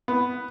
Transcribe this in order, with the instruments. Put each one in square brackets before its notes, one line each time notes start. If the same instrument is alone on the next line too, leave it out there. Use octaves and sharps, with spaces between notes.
[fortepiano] B3